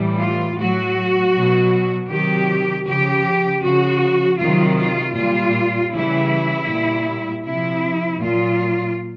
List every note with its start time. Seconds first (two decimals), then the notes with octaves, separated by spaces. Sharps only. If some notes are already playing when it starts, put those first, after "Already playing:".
Already playing: A2 E3 G3
0.19 F4
0.57 A2 F#3 F#4
1.34 B2 F#3
2.10 C3 D#3 F#3 G4
2.86 C#3 F3 G4
3.64 C#3 F3 F#4
4.39 C3 D#3 F#3 F4
4.77 F4
5.15 A#2 G3 F4
5.92 C#3 E3 G3 E4
6.69 A#2 G3
7.45 C3 F3 E4
8.22 A#2 F#3 F4